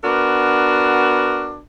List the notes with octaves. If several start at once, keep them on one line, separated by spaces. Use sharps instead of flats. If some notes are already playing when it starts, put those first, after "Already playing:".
B3 D4 F#4 A#4